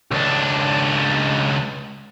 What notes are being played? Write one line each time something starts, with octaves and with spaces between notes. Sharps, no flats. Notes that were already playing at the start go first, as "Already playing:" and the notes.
C#2 D4